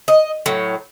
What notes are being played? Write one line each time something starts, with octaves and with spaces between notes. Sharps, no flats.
D#5
A2 F#3